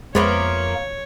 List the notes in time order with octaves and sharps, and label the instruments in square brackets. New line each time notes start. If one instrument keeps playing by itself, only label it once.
[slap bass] F2 [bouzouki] F3 A#3 E5 [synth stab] G#3 B3 B4 [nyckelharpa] C#5